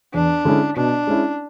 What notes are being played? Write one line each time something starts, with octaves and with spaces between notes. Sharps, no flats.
E2 D4
D3 G#3 C#4 E4
B2 D4
G#3 C#4 E4